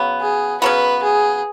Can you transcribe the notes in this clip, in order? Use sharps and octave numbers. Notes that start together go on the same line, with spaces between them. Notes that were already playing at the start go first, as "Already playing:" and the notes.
Already playing: C#3 F#3 B3
G#4
C#3 F#3 B3 B4
G#4